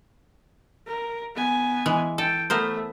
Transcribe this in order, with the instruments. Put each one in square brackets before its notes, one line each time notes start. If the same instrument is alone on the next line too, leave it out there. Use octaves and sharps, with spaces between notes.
[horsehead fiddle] A#4
B3 G#5
[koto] E3 G#3
[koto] A4 [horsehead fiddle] G5
[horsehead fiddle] A3 [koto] B3 A#4 C5